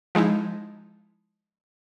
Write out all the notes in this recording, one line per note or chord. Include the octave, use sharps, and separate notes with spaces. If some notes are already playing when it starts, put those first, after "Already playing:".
F3 G#3 D#4 E4